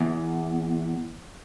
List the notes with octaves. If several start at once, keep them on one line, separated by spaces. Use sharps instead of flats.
E2